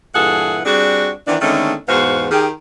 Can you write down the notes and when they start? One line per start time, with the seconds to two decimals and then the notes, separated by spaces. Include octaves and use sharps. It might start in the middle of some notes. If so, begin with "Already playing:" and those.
0.15 G2 A#2 E3 G#4 A4 F#5
0.65 G3 C4 D4 F#4 G#4
1.27 D#3 E3 B3 C4 D4
1.41 D3 D#3 G#3 A3 C4 C#4
1.89 E2 G#2 B3 F#4 C5 F5
2.31 D#3 G4 G#4